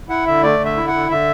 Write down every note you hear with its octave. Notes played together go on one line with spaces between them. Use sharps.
E4 F#5
D3 E5
A3 D5
D3
E5
E4
F#5
D3
D3 E5